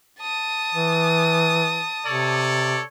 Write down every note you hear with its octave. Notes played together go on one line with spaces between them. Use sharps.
A5 D#6
E3
C3 A4 C#5 D5